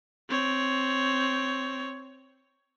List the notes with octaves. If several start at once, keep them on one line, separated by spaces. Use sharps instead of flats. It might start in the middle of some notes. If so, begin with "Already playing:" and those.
C4 C#5